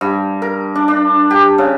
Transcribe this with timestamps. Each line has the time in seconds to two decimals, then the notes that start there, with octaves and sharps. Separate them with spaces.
0.01 G2
0.42 A#4
0.75 D4
0.88 D4
1.31 G4
1.58 C#3